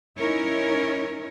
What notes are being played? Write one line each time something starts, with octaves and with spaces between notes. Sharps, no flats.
C#4 D#4 E4 A#4 C#5